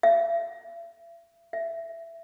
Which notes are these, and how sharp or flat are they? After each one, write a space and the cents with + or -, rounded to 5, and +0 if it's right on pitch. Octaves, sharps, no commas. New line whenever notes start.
E5 +40
E5 +15